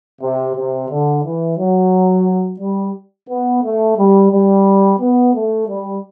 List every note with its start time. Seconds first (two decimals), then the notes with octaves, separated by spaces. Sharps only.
0.21 C3
0.55 C3
0.90 D3
1.24 E3
1.58 F#3
2.60 G3
3.29 B3
3.63 A3
3.97 G3
4.31 G3
5.00 B3
5.33 A3
5.67 G3